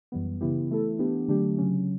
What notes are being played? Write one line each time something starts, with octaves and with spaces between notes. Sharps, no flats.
F#2 E3 G3 B3
C#3 E3 B3 E4 G4
E3 A3 E4 A4
E3 B3 D4 G4
D3 F#3 A3 D4 G4
C#3 F#3 C#4